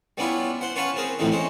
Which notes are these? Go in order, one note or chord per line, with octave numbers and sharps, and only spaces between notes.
G3 B3 C#4 D4 E4 F4
C5 F#5
C#4 B4 C#5 F5 F#5 A5
C4 G#4 A#4
F2 A2 D3 E3 C4 D#4
G#3 C#4 C5